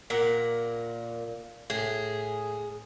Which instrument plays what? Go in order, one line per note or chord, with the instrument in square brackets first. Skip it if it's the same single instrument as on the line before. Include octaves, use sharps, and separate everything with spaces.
[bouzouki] A#2 [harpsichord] A#4 F#5
[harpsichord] A2 [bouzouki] G#4